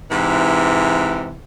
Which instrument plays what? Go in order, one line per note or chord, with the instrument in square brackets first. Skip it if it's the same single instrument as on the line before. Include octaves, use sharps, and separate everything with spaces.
[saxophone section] G#2 C3 E3